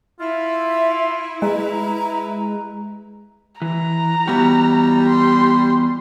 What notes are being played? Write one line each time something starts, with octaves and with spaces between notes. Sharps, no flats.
E4 F4 E5
G#3 B4 A#5
E3 A#5
E3 G3 B3 F#4
C6